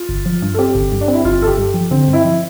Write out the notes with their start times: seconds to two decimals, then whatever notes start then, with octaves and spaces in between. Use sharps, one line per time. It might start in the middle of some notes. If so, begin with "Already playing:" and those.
Already playing: F4
0.09 G1
0.26 F3
0.42 G2
0.54 A4
0.58 C4 G4
0.75 G1
0.92 G2
1.01 D4
1.08 C4
1.13 E4
1.25 G1 F4
1.42 G1 A4
1.47 G4
1.58 G2
1.74 F3
1.91 D3 C4
2.08 G2
2.13 E4
2.25 F3